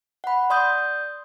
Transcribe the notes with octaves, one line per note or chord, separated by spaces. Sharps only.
F#5 B5
D5 C6 D#6 G6